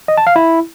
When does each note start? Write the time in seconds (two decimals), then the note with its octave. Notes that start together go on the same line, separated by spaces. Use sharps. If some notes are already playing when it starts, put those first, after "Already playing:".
0.08 D#5
0.17 A5
0.27 F5
0.36 E4